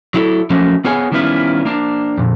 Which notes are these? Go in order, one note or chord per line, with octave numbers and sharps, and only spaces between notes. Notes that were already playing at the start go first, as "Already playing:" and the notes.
F#3 E4 A4
F3 F#3 A3 A#3 C#4 F#4
B3 F4 G#4 C#5 G#5
D#3 G3 B3 C#4 E4 F4
A#3 D4
F2 A#2